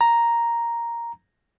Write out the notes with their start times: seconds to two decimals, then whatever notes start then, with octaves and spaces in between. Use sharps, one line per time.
0.01 A#5